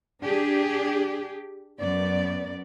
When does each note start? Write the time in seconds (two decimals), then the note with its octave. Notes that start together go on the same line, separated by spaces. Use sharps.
0.22 D4 G4 G#4
1.79 F#2 B3 D5